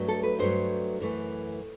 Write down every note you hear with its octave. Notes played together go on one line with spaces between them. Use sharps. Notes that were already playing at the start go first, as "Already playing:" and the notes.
Already playing: G2 F#3 A3
A4
B4
G2 F#3 A3 C5
F#2 E3 A3